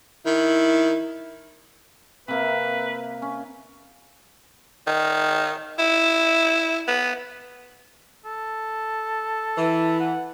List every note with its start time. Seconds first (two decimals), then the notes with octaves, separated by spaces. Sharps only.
0.26 D#3 E4
2.28 C3 A#3 B4 E5
3.22 C#4
4.87 D#3
5.79 E4
6.88 B3
8.25 A4
9.58 E3
10.00 F#5